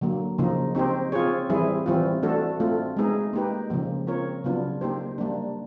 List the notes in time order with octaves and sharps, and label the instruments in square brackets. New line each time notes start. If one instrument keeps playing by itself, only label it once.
[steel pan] D3 F#3 A#3
C#3 F3 A#3 D#4
C4 D#4 G4 C5
C4 F4 G#4 C#5
E3 G3 C4 E4 G#4
E3 G3 C4 F4
A3 D4 F#4 A4
A3 C4 F4
G#3 B3 D#4 G#4
A#3 D#4 G4 B4
C#3 F3 A#3
C4 F4 A#4 C#5
C#3 F#3 B3 D4 F4
A#3 D#4 G4 C5
G3 A#3 D4